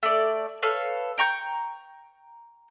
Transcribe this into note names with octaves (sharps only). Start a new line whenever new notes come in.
A3 D5
A4 B4 C#5 F5
G5 A#5 C#6 G6